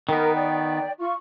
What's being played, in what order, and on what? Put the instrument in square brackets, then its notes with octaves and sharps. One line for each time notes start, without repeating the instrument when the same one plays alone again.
[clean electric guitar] D#3 B3 [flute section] A#4 G5
[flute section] D5 G5
F4 C#6